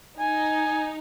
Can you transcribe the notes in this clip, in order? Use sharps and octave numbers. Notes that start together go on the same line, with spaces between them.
D#4 G#5